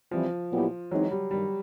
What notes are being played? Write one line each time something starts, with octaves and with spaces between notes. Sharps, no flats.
E3 F3 G3 C4 E4
A#2 F#3 B3 E4 G4
E3 F#3 G#3 C4 D#4
G3
G2 D#3 G3